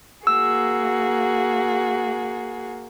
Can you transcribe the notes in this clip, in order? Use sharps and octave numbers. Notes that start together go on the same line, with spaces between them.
A#3 F#4 G#4 E6